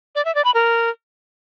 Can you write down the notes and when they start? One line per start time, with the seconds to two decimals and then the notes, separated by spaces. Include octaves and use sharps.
0.15 D5
0.25 E5
0.35 D5
0.45 B5
0.54 A#4